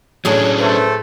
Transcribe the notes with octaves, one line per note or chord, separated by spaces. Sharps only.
A2 F#3 C#4 D4 G#4 C#5
A3 B4 C5